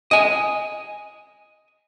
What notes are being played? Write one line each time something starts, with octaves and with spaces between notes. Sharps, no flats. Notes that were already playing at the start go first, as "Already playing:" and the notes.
D#5 G#5